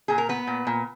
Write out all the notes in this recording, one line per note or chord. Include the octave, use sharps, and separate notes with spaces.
A#2 G#4
A#4
B3 B4
A#2
A#2